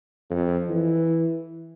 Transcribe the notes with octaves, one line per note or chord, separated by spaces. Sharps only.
F2
E3